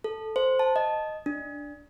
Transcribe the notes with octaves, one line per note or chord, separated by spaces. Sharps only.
A4
C5
A5
D#5
D4